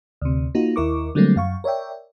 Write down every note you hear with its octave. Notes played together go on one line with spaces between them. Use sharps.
D2 C3
A#3 D#4 F4 F#4
D#2 E4 A#4 C#6 D6
D3 F#3 G3 A3 A#3 C4
F#2 F5 C#6
A#4 C#5 D5 E5 G5